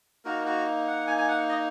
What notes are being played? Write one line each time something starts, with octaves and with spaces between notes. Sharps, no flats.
A#3 D#4 F#4 A#4
F#4
F#5
G#5
G#5
F#5
D#5